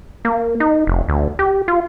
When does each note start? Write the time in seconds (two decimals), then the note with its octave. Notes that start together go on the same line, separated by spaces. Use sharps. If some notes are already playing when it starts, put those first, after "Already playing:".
0.25 A#3
0.60 D#4
0.87 F1
1.09 D2
1.39 G4
1.68 F4